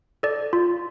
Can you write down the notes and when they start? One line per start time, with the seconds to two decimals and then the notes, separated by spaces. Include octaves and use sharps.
0.23 A4 D5
0.53 F4